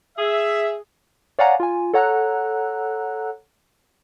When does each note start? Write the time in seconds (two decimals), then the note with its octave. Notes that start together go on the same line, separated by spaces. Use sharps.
0.18 G#4 E5
1.39 C#5 D5 F5 F#5 G#5 A#5
1.60 F4 G#5
1.94 A4 C#5 F#5 A#5 E6 F#6